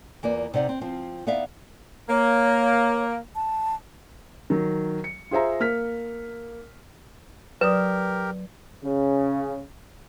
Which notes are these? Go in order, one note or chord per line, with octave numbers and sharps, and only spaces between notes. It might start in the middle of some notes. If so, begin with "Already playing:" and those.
E2 A#3 F4 D5
C3 D#4 D5 F#5
C4
F3 C4 F4
B3 D#4 D5 E5 F5
A#3 C#5
A5
D#3 F#3
C#7
F4 G#4 C5 E5 A#5
A#3 F6 B6
F#3 G4 A#4 B4 D5 D#6
C#3